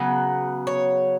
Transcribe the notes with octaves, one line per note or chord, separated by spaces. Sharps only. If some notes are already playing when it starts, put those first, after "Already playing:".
Already playing: C#3 F#3 B3
C#5